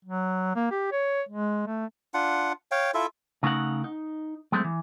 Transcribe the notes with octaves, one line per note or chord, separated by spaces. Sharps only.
F#3
A#3
G4
C#5
G#3
A3
D4 F4 F#5
C#5 F5 G5
E4 F4 A4 E5
C#3 A3 D#4 A#4 F#5
D#4
F#3 G#3 A3 C4
E3